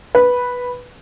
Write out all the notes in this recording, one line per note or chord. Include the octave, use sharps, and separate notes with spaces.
B4